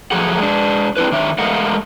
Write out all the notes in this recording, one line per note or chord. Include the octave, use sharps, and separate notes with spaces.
F2 F3 F#3 A3 G#4 F#5
G#3 D4
C4 D4 E4 B4
D#3 D4 C#5 E5
G#3 A3 A#4 D#5 F5 F#5